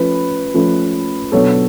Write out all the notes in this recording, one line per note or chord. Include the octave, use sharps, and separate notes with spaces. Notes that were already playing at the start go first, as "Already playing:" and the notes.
Already playing: F3 A3 C#4 B4
F3 A3 C#4
B2 F#3 B3 D4 A4 C#5